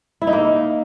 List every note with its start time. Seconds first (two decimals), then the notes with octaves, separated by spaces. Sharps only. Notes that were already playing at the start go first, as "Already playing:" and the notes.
0.22 E4
0.27 D#4
0.33 A#3